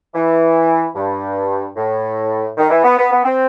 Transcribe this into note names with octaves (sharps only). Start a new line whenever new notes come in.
E3
G2
A2
D#3
E3
B3
B3
B3
C4